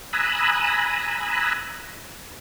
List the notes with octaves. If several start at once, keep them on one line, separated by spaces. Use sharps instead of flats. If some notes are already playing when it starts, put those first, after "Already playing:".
G#5 A#5 B5 D#6 E6 F#6